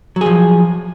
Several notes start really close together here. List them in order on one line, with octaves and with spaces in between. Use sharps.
F#3 G#4 F3